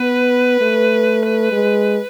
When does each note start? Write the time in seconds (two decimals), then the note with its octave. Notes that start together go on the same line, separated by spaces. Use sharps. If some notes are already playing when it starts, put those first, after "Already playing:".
Already playing: B3 B4
0.61 A3
1.52 G#3